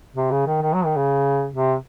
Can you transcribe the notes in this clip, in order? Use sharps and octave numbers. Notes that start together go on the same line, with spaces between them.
C3
C#3
D#3
D#3
F#3
D#3
C#3
C3